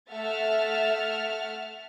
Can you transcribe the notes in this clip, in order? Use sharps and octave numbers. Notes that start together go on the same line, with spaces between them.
A3 E5 F#5 F6 A6